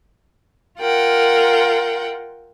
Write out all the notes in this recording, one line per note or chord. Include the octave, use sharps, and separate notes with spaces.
F4 A#4 F#5 G5